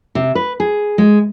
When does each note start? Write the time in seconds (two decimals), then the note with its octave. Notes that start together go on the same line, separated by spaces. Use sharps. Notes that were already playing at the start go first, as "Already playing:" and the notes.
0.15 C3
0.35 B4
0.60 G#4
0.98 G#3